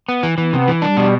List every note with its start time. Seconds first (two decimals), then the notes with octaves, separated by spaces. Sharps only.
0.09 B3
0.23 E3
0.38 E3 B3
0.53 C3
0.68 E3
0.82 G3 D4
0.97 B2